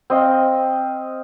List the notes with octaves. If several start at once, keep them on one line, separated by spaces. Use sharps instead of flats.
C4 D#5 F5